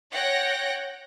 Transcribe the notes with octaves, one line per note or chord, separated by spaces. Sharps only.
C#5 F#5 G5 A#6